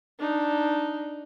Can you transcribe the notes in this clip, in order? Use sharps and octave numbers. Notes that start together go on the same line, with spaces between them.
D4 D#4